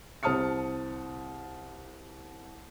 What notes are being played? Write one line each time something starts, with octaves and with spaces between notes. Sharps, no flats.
C2 C5 A5 D#6 F6 C#7